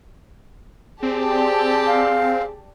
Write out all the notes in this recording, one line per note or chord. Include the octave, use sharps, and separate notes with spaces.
C4 G4 G#4 D5 A5
F5